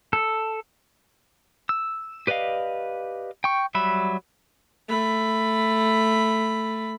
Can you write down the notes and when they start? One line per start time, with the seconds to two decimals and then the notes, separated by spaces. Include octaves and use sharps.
0.13 A4
1.69 E6
2.27 G4 B4 D5 D#5 F5
3.44 G5 C#6
3.75 F#3 G3 E5 B5
4.89 A3 B5